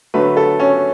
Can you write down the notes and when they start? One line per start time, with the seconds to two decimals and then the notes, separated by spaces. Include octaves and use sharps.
0.14 D3 F#3 A3 B4
0.37 A4
0.60 C#4